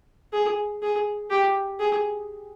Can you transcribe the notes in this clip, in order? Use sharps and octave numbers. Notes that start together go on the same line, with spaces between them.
G#4
G#4
G4
G#4